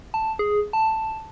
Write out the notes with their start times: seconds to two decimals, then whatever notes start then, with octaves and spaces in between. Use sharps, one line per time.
0.14 A5
0.39 G#4
0.73 A5